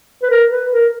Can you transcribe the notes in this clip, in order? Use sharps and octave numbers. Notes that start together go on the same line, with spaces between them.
B4
A#4
B4
A#4